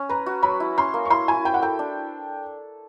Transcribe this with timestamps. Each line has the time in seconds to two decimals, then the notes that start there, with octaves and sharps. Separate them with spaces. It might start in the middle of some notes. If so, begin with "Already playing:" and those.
Already playing: C#4
0.09 B4 A#5
0.26 F#4
0.43 F#3 B5
0.60 E4
0.77 C#4 C6
0.94 A#3
1.05 C#6
1.10 E4 C6
1.28 E4 G#5
1.45 C5 G5
1.54 F#5
1.62 A4 G5
1.79 D4